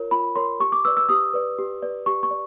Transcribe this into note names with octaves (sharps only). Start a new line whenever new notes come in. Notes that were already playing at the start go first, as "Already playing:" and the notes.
Already playing: F4 A#4 C#5
F4 B5
A#4 C#5 C6
G4 C#6
D6
B4 D5 E6
E6
G4 D#6
B4 D5
G4
B4 D5
G4 C#6
C#6
D5